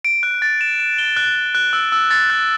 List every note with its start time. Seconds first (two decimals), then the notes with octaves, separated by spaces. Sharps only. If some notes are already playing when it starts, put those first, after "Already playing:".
0.05 D7
0.23 F#6
0.42 A6
0.61 E7
0.80 E7
0.98 G7
1.17 F#6
1.35 F#6
1.55 F#6
1.73 E6
1.92 E6
2.11 A6
2.30 F#6